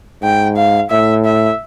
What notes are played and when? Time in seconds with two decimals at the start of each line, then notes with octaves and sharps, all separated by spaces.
0.22 G#2 G5
0.56 F5
0.90 A2 E5
1.25 E5